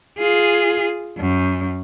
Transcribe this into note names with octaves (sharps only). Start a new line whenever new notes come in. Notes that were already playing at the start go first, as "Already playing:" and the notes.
F4 G#4
F#2